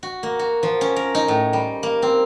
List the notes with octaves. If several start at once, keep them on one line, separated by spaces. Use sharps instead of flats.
F#4
A#3
F#4
F3
C#4
A#4
D#4
A2
G3
A#3
C4